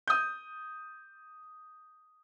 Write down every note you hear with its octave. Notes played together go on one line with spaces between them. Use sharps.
D#6 G6